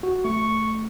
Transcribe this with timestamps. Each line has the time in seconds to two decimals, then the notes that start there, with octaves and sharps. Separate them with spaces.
0.03 F#4
0.25 A3 C#6